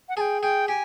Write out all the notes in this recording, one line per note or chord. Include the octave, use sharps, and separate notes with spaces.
F#5
G#4 G5 A5
G#4 G5
G4 G#5